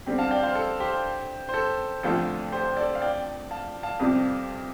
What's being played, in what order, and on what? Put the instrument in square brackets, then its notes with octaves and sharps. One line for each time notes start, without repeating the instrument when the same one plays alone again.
[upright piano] D3 G3 C4 [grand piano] G4
[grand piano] F5 A5
D5 G5
C5 F5
A4
G4 C5
C5
A4
[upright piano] F2 D3 F3 A3 F4 [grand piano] A4
[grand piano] G4 C5
A4 D5
F5
D5 G5
F5 A5
F5 A5
[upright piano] F2 C3 G3 C4 G4